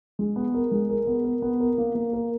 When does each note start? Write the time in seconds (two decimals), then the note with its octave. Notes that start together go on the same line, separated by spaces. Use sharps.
0.19 G#3
0.36 B3
0.54 A#4
0.72 G#3
0.89 A#4
1.07 B3
1.24 A#4
1.42 B3
1.60 A#4
1.78 A#3
1.95 A#3
2.13 A#4